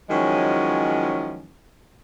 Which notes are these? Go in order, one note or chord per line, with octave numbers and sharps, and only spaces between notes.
D#3 F3 F#3 G#3 C#4 E4